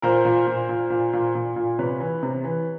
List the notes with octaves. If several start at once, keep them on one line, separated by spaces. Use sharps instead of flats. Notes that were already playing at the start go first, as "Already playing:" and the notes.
A#2 A#4 C5
A#2
A#2
A#2
A#2
A#2
A#2
A#2
C3 B4 C#5
E3
C3
E3